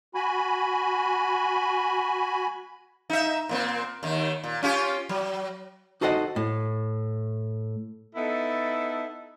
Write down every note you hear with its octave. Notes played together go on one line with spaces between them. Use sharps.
F#4 G#5 B5
D#4 E5
A#2 A#3 C4
D#2 D#3
A#2
C#4 F4 G4
F#3
D#4 F#4 A4 C5 D#5 F#5
A2
B3 D#4 E4 A4